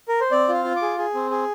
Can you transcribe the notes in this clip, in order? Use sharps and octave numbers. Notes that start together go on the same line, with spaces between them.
A#4
C5
C4 D5
F4 F5
F4
D6
G#4
G#4
C4
G#4